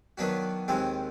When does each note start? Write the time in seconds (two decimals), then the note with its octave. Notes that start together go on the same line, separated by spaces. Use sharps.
0.18 D#3 F#3 B3 D4 F#4
0.68 D#2 D#3 G#3 C4